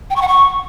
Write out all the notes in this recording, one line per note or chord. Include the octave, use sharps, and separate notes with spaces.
G5
C#6
F#5
C#6